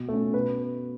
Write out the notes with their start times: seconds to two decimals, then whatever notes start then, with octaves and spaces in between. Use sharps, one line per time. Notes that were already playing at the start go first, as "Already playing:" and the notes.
Already playing: B2
0.09 A3 C#4
0.34 B2 B4